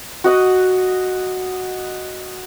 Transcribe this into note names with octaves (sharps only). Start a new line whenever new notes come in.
F#4 D#5 F#5